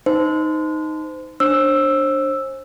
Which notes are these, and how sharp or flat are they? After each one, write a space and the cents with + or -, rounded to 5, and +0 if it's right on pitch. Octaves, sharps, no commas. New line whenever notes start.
D#4 +0 C5 -30
D4 +0 C5 +35 E6 +0